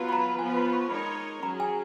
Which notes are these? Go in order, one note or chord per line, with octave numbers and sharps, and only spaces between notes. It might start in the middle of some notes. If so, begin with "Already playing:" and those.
Already playing: F#3 B3 F4 B4
B5
A#5
F3 B3 F4 B4 G#5
B5
C#6
G#3 D#4 A#4 C#5 B5
F#3 C#4 G#4 A#5
G#5